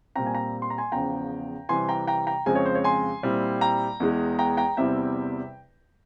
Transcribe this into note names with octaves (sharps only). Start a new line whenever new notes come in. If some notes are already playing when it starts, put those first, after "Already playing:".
A#2 G3 C4 G5 A#5
G#5
G5 A#5
C6
A#5
G#5 C6
E2 C#3 F3 G5 A#5
C3 E3 G3 C4 G#5 C6
G5 A#5
G5 A#5
G5 A#5
F2 C#3 F3 G#3 C4 F5 G#5
C#5
C5
C#5
G#5 C6
A#2 G3 C4 E4
G5 A#5
E2 E3 G#3
G5 A#5
G5 A#5
E2 C3 G3 C4 E4 E5 G5